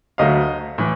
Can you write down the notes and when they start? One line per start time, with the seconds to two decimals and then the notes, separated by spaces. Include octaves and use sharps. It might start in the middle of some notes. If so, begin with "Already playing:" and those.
0.18 D2 D3 F#3 A3 D#5 F5
0.78 A2 E3